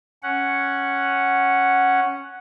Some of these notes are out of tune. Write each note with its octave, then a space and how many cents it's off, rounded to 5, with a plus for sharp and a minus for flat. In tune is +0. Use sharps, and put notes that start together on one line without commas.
C#4 +0 F#5 +0